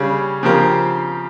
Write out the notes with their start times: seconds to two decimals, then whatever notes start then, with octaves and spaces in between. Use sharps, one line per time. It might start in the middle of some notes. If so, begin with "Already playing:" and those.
Already playing: C#3 G3 C#4 G#4
0.43 C#3 F3 C4 G4 A#4